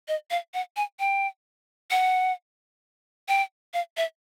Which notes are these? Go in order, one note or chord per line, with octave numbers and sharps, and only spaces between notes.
D#5
F5
F#5
G#5
G5
F#5
G5
F5
E5